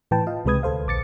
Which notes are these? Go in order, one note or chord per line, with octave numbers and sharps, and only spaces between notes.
A2 E3 B4 G5 A5
F4 D#5 F5
C#2 C3 G#3 B4 D#6 G#6
D2 A4 C5 F5
A#1 D6 A6 C#7